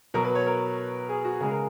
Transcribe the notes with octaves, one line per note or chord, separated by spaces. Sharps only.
B2 F#3 A#4
B4
C#5
A#4
G#4
F#4
C#3 G#3 G#4
A#4